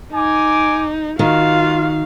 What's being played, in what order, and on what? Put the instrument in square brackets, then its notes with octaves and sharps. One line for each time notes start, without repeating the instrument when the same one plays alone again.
[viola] D#4 [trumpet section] G#5 D6
[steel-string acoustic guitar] D#3 [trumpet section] F4 [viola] F#4 F5